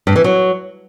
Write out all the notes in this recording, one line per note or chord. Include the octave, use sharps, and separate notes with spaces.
G2
E3
F#3